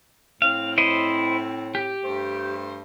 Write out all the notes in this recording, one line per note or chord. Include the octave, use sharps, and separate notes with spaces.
A2 C4 F5
E4 C5 D#5
G4
G2 A3 C5